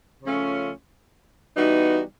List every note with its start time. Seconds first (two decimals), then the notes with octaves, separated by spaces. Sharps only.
0.23 C#3 F3 A3 C#4 F4
1.54 E3 G3 B3 D#4 F#4